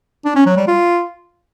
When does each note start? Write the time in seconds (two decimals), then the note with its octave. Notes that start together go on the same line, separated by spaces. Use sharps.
0.25 D4
0.35 C#4
0.46 F#3
0.57 G3
0.67 F4